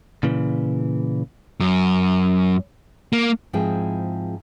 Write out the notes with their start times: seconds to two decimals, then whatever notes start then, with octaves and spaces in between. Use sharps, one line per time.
0.23 A#2 C#3 E3
1.60 F#2
3.13 A#3
3.53 G#2 F3 C4 E4 G#4 G5